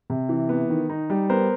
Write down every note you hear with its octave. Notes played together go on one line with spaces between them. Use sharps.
C3
E3
B3
D#3
D#4
G3
B3 A#4 C5